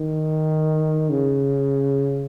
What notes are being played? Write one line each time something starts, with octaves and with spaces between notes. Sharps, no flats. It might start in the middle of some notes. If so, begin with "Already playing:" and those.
Already playing: D#3
C#3